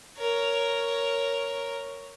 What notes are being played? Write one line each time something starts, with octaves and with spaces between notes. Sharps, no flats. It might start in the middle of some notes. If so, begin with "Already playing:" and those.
A#4 C#5